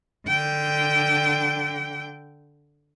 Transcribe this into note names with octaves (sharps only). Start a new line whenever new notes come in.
D3 G5